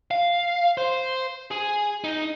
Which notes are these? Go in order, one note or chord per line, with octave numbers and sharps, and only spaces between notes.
F5
C5
G#4
D#4